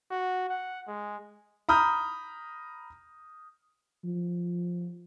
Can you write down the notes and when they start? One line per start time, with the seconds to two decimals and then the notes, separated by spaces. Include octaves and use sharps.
0.11 F#4
0.49 F#5
0.87 G#3
1.69 A#5 B5 D#6 F6 G6
4.04 F3